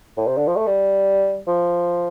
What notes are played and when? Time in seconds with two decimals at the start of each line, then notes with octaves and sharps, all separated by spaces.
0.17 A2
0.27 C3
0.37 D3
0.47 F3
0.56 A3
0.67 G3
1.47 F3